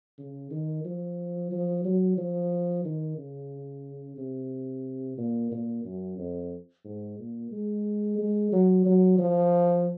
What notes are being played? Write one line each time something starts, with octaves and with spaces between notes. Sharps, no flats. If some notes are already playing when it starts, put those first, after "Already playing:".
C#3
D#3
F3
F3
F#3
F3
D#3
C#3
C3
A#2
A#2
F#2
F2
G#2
A#2
G#3
G#3
F#3
F#3
F3